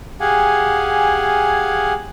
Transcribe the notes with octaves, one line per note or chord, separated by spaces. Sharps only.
G4 G#4 F5 F#5 G#5